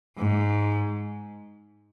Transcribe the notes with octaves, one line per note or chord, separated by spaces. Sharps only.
G#2